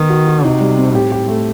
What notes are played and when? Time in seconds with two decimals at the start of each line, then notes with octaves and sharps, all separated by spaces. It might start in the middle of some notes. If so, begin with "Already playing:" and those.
Already playing: D#3 B3
0.09 F#4
0.27 F#4
0.44 C3 D#4
0.61 G3
0.78 C4
0.94 A2 G4
1.12 G4
1.28 A3